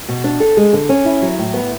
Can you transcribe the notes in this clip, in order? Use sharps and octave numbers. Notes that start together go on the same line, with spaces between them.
B2
D4
A4
G#3
D3
C#4
E4
F#3
A2
B3